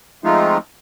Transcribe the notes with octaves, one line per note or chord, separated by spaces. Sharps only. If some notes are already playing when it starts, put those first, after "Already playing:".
F3 G#3 A3 C4 D#4 F4